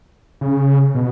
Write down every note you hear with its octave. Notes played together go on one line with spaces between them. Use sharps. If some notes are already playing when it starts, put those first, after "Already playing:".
C#3
B2